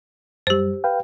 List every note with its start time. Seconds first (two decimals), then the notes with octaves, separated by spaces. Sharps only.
0.47 F#2 G3 G4 C5
0.84 B4 F5 G5